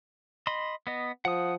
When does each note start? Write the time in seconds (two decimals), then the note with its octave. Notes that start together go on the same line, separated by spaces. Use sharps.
0.47 D#5 B5 C6
0.87 B3 D#5
1.25 F3 F#5 D#6